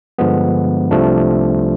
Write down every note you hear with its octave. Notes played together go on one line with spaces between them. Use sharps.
G2 D3 F3 G#3 B3
C2 C3 F3 A3 D4